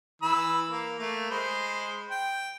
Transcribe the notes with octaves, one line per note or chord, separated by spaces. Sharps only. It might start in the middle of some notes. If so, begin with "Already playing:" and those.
E3 B5 E6
A#3
A3 A#3
G#3 C5 B5
G5